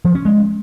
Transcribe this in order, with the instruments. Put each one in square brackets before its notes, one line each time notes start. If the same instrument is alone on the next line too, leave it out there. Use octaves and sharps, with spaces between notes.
[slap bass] F3
C#4
G#3